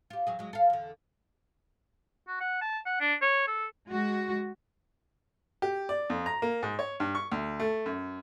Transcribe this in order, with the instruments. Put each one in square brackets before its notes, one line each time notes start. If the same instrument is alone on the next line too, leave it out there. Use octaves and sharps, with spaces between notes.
[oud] F4 G4
E2 F#3 G#4
F#3 G#3
A4 F5
E2 D3
[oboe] F#4
F#5
A5
F#5
D4
C#5
A4
[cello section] G#3 F#4
[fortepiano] G4
D5
F2
A#5
A#3
G#2
C#5
G2
C#6
D2
A3
F#2